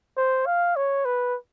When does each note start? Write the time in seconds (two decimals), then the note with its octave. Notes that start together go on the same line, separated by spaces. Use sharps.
0.17 C5
0.46 F5
0.76 C#5
1.05 B4